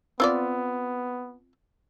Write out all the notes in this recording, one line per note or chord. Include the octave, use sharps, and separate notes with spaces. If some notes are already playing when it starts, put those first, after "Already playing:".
B3 C4 F4 D5